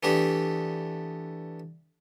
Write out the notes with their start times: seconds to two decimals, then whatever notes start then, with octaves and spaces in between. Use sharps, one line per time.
0.03 E3 A3 B3 D4 G4